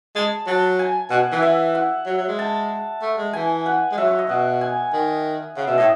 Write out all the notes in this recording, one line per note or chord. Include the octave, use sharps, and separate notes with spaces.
G#3 A5
F#3 A5
G#5
B2 F#5
E3 F#5
E5
F#5
F#3
F#3
G#3
A5
A3
G#3
E3 G#5
F#5
G#3
F#3 E5
C#5
D#5
B2 F#5
G#5
D#3
C#3 F#5
B2 E5
A2 D#5